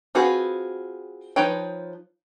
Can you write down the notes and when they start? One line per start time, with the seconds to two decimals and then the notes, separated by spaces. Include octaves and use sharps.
0.15 C4 F4 F#4 G#4 B4
1.36 F3 D#4 B4 C#5 G5